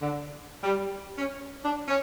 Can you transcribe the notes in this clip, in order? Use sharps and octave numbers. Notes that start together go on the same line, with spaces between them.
D3
G3
C#4
D4
C#4